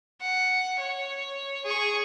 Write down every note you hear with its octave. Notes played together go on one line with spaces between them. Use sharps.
F#5
C#5
G#4 C#6